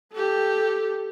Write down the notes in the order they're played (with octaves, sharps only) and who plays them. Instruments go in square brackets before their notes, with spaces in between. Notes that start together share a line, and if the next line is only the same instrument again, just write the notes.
[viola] G4 A4